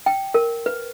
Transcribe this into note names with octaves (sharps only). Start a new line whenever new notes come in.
G5
A#4
B4